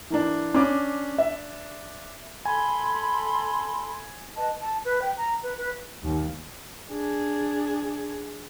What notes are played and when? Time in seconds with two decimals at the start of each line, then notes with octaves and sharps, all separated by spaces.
0.10 E3 A#3 D4
0.54 C#4 D4 D6
1.18 E5
2.45 A4 G#5 B5 C6
4.36 B4 D#5 A5
4.61 A5
4.85 B4
5.02 G5
5.17 A#5
5.43 B4
5.58 B4
6.02 D#2
6.91 D4 G#4